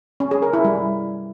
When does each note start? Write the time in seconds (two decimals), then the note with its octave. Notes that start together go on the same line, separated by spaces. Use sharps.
0.20 C#4
0.31 G#4
0.42 A#4
0.53 E4
0.64 G3